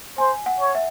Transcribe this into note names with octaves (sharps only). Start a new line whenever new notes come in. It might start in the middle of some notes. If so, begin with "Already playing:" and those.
C5 G#5
F#5
C#5
E5